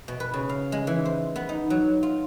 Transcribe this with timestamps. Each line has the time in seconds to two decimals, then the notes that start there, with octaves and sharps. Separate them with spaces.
0.08 B2
0.20 B4
0.34 C#3
0.49 F5
0.72 G#3
0.87 E3
1.06 C5
1.36 B3
1.49 D#4
1.70 F#3
2.03 F4